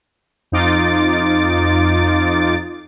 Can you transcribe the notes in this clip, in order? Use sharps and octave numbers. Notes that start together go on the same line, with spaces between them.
F2 D#4 F4 D6 A6